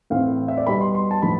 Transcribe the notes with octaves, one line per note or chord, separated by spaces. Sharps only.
A2 E3 A3 C4 F5
E5
D5
B2 G3 B3 B5
C6
C6
A5
A2 F3 B3 B5